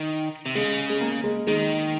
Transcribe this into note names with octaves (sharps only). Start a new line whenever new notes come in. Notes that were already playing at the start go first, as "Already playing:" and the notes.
Already playing: D#3
C3
C#3 G#3
G#3
A#3
G#3
D#3 G#3